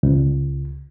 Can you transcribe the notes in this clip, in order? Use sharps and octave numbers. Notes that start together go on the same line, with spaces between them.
C#2